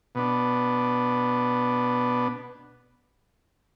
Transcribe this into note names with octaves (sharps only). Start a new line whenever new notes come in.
B2 B3 D4